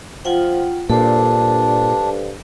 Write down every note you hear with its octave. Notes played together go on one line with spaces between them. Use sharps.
F3 F4 F#5 G5
G2 A#2 D4 A4 C5